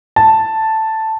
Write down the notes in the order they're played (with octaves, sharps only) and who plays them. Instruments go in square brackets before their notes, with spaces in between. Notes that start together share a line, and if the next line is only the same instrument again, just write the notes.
[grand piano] A5